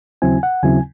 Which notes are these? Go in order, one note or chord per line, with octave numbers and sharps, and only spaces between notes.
D#2 C#3 F#3 C4 E4 G#5
F#5
D#2 C#3 F#3 C4 E4 G#5